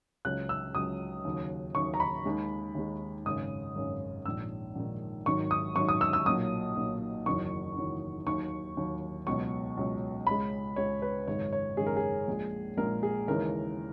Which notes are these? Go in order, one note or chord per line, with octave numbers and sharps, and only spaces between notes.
C#2 C#3 F#3 F#6
E6
C#2 C#3 F#3 D#6
D#2 C#3 F#3
D#2 C#3 F#3 C#6
A#5
B5
D#2 D#3 G#3
D#2 D#3 G#3
G#1 F#2 C#3 D#6
G#1 F#2 C#3
A#1 G#2 D#3 E6
A#1 G#2 D#3
G#1 G#2 D#3 F#3 C#6
D#6
G#1 G#2 D#3 F#3 C#6
D#6
E6
E6
B1 A#2 F#3 D#6
B1 A#2 F#3
F#1 E2 D#3 F#3 C#6
F#1 E2 D#3 F#3
D#2 D#3 F#3 C#6
D#2 D#3 F#3
C#2 B2 F#3 C#6
C#2 B2 F#3
C#2 C#3 G#3 B5
C#2 C#3 G#3 C#5
B4
G#1 F#2 C#3 G#3 C#5
C#5
G#1 F#2 C#3 G#3 G#4
A#4
G#4
A#1 A#2 G#3
A#1 A#2 G#3 A#4
G#4
D#2 C#3 E3 G#3 A#4